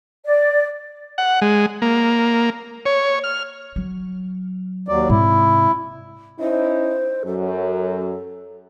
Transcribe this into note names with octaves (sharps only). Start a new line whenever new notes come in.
D5
F#5
G#3
A#3
C#5
F6
F#3
D#2 F#3 D5
G#2 C3 E4
C#4 D#4 E4 C5
F#2 F#3 A4